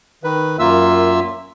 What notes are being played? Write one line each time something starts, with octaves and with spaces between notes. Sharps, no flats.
D#3 B4
F#2 A#3 F4 E5 E6